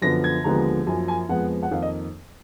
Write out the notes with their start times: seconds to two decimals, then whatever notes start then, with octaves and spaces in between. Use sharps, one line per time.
0.02 F#2 D3 F3 B3 A#6
0.24 G#6
0.44 D#2 D3 F3 G#3 B3 A#5
0.86 F#2 F3 A#3 G#5
1.08 G#5
1.29 F2 F3 G#3 B3 F#5
1.63 F#5
1.71 F2 D#3 A#3 F5
1.82 D#5